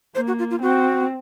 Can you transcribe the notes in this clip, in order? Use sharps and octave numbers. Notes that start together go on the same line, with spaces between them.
A#3 C5
F#4
F4
F4
C4 F#4